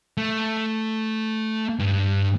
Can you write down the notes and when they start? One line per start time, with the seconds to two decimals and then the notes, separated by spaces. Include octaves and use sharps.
0.17 A3
1.79 G2